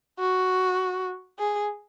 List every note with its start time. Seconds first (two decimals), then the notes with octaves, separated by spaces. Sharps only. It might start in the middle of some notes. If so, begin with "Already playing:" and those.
0.20 F#4
1.39 G#4